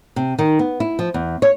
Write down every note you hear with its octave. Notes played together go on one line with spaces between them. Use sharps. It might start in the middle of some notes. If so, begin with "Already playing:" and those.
C3
D#3
B3
E4
F3
E2
C#5